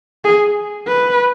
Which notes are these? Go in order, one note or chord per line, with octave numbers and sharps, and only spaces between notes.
G#4
B4